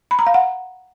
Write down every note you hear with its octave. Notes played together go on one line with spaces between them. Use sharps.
B5
A#5
F5
F#5